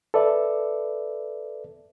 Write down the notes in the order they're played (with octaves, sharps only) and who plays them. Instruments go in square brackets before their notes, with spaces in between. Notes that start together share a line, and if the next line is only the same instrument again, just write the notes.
[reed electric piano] A4 B4 D5 E5